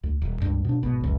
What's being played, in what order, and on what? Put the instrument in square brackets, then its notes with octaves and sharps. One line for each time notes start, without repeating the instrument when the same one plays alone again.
[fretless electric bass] D2
D#1
C#2 G2
B2 D4
G#1 B2
F#1 C#2